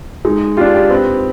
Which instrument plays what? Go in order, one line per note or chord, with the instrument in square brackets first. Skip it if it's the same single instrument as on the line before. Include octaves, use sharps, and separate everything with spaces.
[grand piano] G#3 [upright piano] D#4
[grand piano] D4 F4 [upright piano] G4
[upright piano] G4
[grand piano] C4 [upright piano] B4